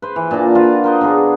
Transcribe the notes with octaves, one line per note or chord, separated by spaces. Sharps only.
B4 C5
E3
A#2 D4 F#4 A5
F4 F#4 B4 A5
A#4 C5 D#5
D3 B3 F#4 G#4